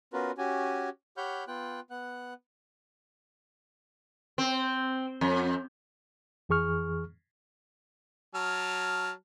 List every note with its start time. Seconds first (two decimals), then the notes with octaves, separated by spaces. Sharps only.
0.13 B3 C#4 F4 F#4 A#4 B4
0.38 C#4 F#4 G4 G#5
1.17 G4 C#5 F#5 B5 F6 G6
1.48 B3 F4 G5 F#6
1.90 B3 F#5 F#6
4.38 C4
5.21 F2
6.49 F2 E3 G#4 C#6 F6
8.35 F#3 A5 F6